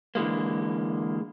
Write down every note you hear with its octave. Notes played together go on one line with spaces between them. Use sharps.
D3 E3 G#3 A#3